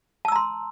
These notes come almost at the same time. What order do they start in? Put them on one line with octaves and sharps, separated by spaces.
A5 E6 A#5 C6